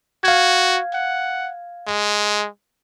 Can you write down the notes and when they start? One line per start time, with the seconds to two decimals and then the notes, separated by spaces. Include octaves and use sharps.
0.24 F#4 F5 G#6
0.94 F#5
1.87 G#3